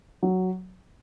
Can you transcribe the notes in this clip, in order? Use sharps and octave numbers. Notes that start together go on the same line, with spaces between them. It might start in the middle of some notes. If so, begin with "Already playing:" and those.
F#3